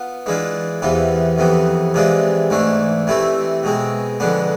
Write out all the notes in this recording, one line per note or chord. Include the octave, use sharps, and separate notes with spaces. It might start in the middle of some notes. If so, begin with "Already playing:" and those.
Already playing: B3 F4
E3 G#3 D4 F4
E2 C3 E3 B3 F4
F2 C3 E3 B3
C3 E3 G#3 D4 F4
G#2 E3 A3 D4
C3 E3 A3 C4 E4
B2 G#3 C4
F2 D3 G#3 B3 D4